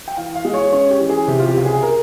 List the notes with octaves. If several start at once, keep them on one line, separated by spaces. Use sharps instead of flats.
G5
E3 F5
F5
G#3
C#5
C#4 C#5
G4
E3
G#4
C3 G4
F4
G4
C#2
G#4
A#4